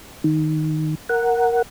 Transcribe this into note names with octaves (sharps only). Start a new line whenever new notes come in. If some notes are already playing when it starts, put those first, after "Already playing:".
D#3
A#4 F#5